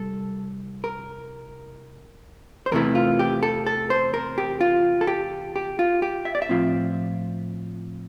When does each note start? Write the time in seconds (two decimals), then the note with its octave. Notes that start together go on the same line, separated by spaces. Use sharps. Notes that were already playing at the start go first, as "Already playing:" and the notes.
Already playing: C2 G3 A4
0.84 A#4
2.66 C5
2.71 E2 C3 E3 A3 E4 A#4
2.95 F4
3.19 G4
3.43 A4
3.66 A4
3.90 C5
4.14 A#4
4.38 G4
4.61 F4
5.01 A4
5.07 G4
5.56 G4
5.79 F4
6.02 G4
6.25 E5
6.35 D5
6.42 E5
6.49 A2 F3 C4 F4